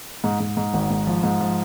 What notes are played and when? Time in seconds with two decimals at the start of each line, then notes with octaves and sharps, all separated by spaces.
0.24 G#2
0.40 G#2
0.57 G#2
0.73 G#1
0.90 G#2
1.07 F3
1.23 G#2
1.40 F3